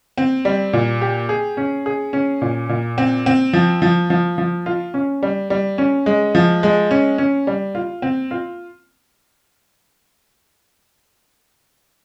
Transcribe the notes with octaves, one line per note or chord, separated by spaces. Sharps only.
C4
G3
A#2
G4
G#4
C#4
G#4
C#4
A#2
A#2
C4
C4
F3
F3
F3
F3
F4
C#4
G3
G3
C#4
G#3
F3
G#3
C#4
C#4
G3
F4
C4
F4